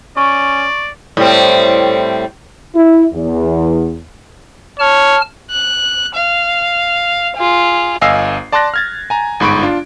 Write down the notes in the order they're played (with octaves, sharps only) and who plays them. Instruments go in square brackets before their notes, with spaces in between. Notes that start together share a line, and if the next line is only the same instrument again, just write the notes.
[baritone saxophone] C#4 [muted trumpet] D5 [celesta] C#6
[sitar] A2 G3 C4
[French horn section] E4
E2
[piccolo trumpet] C#5 [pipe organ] A5 F6
[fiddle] F#6
F5
F4 G#4
[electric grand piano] G1 D#5 F5 G#5 E6 C7
D5 A5 C6 D6 F#6 A#6
F6 G#6 A6
G#5 A#5
G1 G#2 B5 C#6 D7
D4 F4